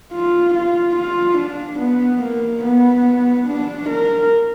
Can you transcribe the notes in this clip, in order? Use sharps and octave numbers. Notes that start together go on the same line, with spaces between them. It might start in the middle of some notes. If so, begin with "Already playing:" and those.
F4
F4
F4
D4
B3
A#3
B3
D4
A#4